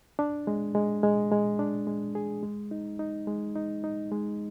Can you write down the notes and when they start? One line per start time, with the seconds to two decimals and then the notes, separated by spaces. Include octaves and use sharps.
0.19 D4
0.47 G#3
0.75 G#3
1.03 G#3
1.32 G#3
1.59 D4
1.87 G#3
2.15 G#4
2.43 G#3
2.71 D#4
2.99 D#4
3.27 G#3
3.56 D#4
3.84 D#4
4.12 G#3